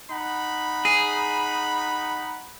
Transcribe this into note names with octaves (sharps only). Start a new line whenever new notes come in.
D#4 F#5 B5
G#4